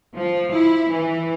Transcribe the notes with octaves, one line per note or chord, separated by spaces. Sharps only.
F3
E4
E3